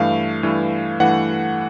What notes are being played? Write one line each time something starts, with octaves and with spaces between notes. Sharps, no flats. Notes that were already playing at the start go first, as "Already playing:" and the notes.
Already playing: G2 E3 A3 F5
G2 E3 A3
G2 E3 A3 F#5